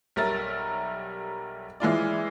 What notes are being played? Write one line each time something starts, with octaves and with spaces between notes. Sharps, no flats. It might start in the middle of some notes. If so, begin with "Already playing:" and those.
B1 G3 A#4 E5 A6
E3 G#3 F4 D5